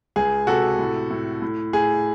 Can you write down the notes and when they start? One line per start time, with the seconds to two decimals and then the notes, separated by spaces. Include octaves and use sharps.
0.16 C#2 G#4
0.47 C3 F#4 A4
0.79 A2
1.11 A2
1.42 A2
1.73 A2 G#4